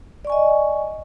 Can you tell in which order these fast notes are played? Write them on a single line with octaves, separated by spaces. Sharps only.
D5 C#6 G#5 D#5